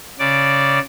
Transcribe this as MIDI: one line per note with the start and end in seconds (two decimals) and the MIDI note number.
0.19 0.79 49
0.19 0.79 74